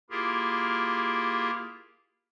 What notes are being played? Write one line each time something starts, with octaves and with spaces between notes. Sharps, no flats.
A#3 E4 F4 G4 G#4 A#4